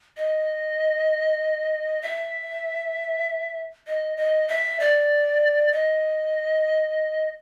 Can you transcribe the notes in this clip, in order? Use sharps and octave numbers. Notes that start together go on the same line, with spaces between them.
D#5
E5
D#5
D#5
E5
D5
D#5